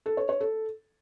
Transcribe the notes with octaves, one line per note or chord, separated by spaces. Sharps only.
A4
C#5
C#5
A4